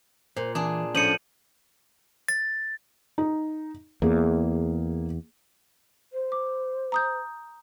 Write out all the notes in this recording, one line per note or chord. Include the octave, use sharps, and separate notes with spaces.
A#2 C5
E3 D4 G#4 G#5
A2 F3 C#4 D4 A4 C#7 D#7 F#7
A6
D#4
E2 A#3 G#4
C5
D6
A#5 D#6 G6